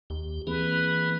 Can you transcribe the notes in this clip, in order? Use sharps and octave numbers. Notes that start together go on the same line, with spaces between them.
D#2 G4
E3 A#3 C4 G#4 B4